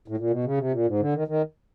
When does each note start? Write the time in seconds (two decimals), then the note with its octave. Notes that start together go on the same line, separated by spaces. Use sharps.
0.08 A2
0.17 A#2
0.30 B2
0.44 C#3
0.58 C3
0.72 A#2
0.86 G#2
0.99 D3
1.14 D#3
1.28 D#3